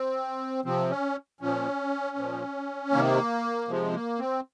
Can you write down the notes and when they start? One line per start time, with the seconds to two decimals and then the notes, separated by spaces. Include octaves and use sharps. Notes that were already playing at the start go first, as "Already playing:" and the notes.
Already playing: C4
0.65 C3 F3 C4
0.90 C#4
1.41 A#2 F3 C#4
2.17 A#2 F3
2.92 C3 D#3 A#3
3.68 C3 F3 G#3
3.94 A#3
4.19 C4